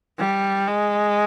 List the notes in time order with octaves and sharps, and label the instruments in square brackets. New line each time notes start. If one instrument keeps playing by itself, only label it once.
[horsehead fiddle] G3
G#3